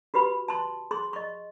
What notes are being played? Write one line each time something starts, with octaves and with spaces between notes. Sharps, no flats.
F#4 G4 B4 B5
A5 C6
G#4 C6
D#5 C#6